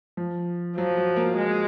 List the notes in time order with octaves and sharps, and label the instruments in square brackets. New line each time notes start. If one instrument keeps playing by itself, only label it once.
[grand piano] F3
[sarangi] F3 [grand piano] F#3
[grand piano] F#3
A#3
[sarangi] G#3